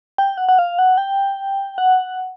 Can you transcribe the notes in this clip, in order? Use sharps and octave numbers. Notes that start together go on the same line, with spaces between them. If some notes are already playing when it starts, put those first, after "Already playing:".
G5
F#5
F#5
F5
F#5
G5
F#5